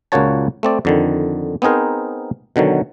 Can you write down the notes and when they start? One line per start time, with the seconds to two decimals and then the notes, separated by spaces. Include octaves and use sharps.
0.12 C#2 A#2 A#3 F#4 C#5 A5
0.63 A3 C4 D5
0.85 F2 D3 D#3
1.62 B3 C4 D#4 G#4 A#4 C5
2.56 B2 D3 D#3 F#3